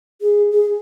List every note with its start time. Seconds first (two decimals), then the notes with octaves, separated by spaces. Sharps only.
0.21 G#4
0.51 G#4